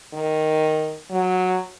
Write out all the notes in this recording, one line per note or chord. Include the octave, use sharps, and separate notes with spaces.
D#3
F#3